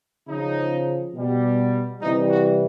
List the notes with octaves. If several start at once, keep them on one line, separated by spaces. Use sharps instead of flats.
C#3 F3 D#4
B2 G3
C3 E3 G3 D#4
F#4